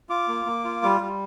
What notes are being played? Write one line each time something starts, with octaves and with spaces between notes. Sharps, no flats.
F4 D6
A#3
A#3
F4
G3
G3